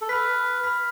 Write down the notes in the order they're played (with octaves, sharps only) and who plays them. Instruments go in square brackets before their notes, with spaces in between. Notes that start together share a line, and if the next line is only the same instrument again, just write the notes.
[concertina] A4
[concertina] B4 [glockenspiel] B5 F6 B6
[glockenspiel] B5 F6 B6